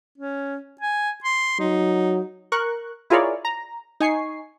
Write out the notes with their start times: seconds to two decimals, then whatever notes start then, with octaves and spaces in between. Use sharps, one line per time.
0.18 C#4
0.81 G#5
1.24 C6
1.59 F#3 D#4
2.52 A#4 C#6 F#6
3.10 E4 F4 G#4 A#4 C#5 D5
3.45 A#5
4.00 D#4 G#5 C#6 C7